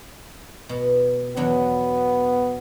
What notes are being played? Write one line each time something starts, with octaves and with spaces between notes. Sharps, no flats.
B2
E2 F#3 B3 D4